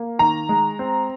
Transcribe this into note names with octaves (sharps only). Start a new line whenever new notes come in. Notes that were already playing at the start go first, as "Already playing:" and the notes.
Already playing: A#3
D#3 A#5
G#3
C4